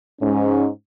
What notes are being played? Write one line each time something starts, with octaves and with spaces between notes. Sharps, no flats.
G#2 C#4